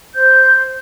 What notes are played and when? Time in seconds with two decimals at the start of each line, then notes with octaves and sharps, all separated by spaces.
0.15 C5 G6